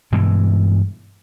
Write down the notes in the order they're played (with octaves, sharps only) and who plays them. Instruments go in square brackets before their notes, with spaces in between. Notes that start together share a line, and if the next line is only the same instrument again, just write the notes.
[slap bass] G2 B2 E3 G#3